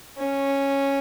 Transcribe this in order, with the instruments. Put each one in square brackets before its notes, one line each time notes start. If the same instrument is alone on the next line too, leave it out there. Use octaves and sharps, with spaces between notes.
[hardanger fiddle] C#4